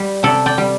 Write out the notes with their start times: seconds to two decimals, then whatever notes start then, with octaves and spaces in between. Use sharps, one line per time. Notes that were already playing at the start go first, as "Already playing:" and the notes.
Already playing: G3
0.23 C3 A4 D5
0.46 D5 G5
0.58 G3